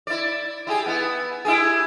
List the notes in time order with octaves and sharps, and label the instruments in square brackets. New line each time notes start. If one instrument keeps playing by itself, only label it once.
[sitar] E4 D5
E4 G4 G#4
B3 E4
E4 G4 G#4